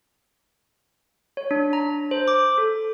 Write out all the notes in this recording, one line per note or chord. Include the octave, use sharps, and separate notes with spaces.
C#5
D4
A#5
C5
D6
A4